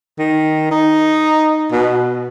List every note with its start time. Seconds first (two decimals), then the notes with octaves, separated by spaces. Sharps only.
0.19 D#3
0.71 D#4
1.72 B2